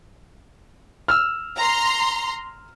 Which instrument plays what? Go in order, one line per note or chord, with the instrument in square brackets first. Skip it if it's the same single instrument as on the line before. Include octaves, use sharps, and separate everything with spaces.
[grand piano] E6 F6
[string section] A#5 C6